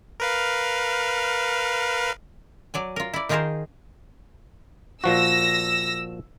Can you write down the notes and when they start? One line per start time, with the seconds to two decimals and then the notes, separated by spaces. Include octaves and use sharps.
0.20 A#4 B4 F5
2.74 F#3 D5 G#5
2.96 F4 A#4
3.14 E4 D5
3.29 D#3 D#4 F4 G#4 A#4 C5
5.04 A#2 F3 F#4 E6 A#6